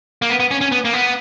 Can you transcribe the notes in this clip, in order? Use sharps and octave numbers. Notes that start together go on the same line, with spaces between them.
A#3
B3
B3
C#4
C#4
B3
A#3
B3